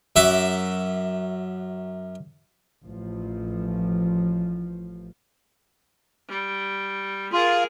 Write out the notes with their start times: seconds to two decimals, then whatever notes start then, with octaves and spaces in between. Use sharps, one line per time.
0.16 F#2 E5 F#5 D6
2.84 A1 F3
6.28 G3
7.33 F4 G#4 A#4